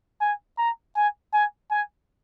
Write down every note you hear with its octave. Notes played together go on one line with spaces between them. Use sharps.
G#5
A#5
G#5
G#5
G#5